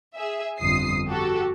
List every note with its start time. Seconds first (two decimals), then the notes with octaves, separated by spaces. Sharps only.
0.15 G#4 E5
0.60 G1 F2 D#6 C7
1.09 F#4 G4 A4